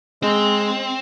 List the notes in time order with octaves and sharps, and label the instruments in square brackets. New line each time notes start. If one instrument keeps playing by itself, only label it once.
[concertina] G#3 [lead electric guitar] C4